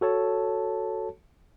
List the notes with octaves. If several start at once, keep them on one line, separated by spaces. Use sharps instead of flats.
F#4 A4 C#5 A5